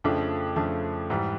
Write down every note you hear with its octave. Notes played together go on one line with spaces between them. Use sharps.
F2 C#3 F3 A3 D4
F2 C#3 F3 A3 D4
G#2 E3 G3